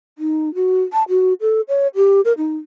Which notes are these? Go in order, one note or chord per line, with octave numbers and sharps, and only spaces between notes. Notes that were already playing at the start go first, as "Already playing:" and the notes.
D#4
F#4
A5
F#4
A4
C#5
G4
A#4
D#4